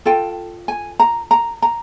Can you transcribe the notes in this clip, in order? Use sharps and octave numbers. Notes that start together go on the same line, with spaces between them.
F4 A4 G5
G#5
A#5
A#5
A#5